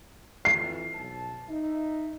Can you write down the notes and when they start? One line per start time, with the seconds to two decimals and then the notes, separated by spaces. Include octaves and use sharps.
0.45 F2 E3 C7
0.94 B1 A5
1.49 D#4 E5